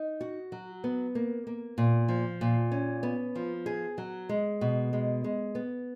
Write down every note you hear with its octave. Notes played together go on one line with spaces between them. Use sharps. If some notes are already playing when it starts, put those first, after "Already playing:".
Already playing: D#4
F#4
F#3
B3
A#3
A#3
A#2
F3
A#2
C#4
B3
F3
G#4
F#3
G#3
B2
G#3
G#3
B3